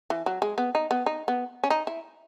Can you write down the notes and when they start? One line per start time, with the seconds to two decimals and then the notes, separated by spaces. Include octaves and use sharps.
0.10 E3
0.26 F#3
0.42 G#3
0.58 B3
0.75 D#4
0.91 B3
1.06 D#4
1.28 B3
1.63 C#4
1.70 D#4
1.87 E4